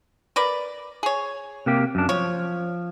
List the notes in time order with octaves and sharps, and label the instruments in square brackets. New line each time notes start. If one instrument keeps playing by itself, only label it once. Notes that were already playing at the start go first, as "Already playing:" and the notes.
[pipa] A#4 B4 D5
G#4 C#5
[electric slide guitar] C3 A#3 G4
F#2 D4
[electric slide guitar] F3 [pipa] C#5